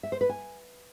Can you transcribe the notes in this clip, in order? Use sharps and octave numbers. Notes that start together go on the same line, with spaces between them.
E5
C5
B4
G#5